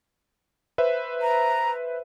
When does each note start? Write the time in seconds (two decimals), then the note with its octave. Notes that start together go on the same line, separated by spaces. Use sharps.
0.78 B4 C5 E5
1.21 A#5